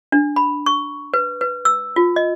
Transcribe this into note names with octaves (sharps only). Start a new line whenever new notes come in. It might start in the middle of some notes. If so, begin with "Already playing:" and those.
D4
B5
C#6
B4
B4
E6
F4
D#5